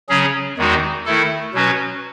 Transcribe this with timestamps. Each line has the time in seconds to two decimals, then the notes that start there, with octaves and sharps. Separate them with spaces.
0.09 C#3 F#3 C#4 G#4
0.57 E2 D#3 G#3 D#4 F#4
1.05 D#3 A3 E4 A4
1.54 B2 F#3 C#4 F#4 B4